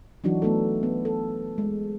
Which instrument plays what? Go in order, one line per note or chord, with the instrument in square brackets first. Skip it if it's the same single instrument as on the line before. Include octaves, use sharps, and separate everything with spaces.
[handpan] E3 F#3 D4 D#4 F#4
A3 B3 D4 A4
B3
A4
G#3